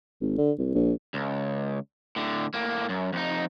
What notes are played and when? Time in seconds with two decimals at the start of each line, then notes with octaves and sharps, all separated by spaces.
0.21 G#1
0.38 D3
0.59 C2
0.75 A#1
1.14 C#2
2.16 A2 D3
2.54 A2 A#3
2.89 F#2
3.13 F2 D#4